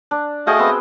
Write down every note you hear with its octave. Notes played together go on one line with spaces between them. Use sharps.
D4
A3 F#4 G#4 D#5 F5 G5
B3 C4